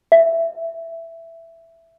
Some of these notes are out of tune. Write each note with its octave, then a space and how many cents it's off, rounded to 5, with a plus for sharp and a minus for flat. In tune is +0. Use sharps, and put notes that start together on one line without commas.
E5 +10